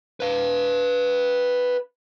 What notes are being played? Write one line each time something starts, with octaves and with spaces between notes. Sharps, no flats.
B4 F5